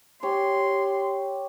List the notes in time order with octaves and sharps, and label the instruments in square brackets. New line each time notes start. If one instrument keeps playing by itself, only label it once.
[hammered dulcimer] G4 C#5 [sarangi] C6